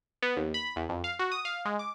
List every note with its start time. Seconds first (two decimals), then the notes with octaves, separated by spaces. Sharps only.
0.22 B3
0.37 D#2
0.54 B5
0.76 E2
0.89 F2
1.04 F5
1.19 F#4
1.32 D#6
1.45 F5
1.65 G#3
1.79 D6